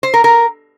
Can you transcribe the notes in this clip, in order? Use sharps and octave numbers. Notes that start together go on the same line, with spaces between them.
C5
A#4
A#4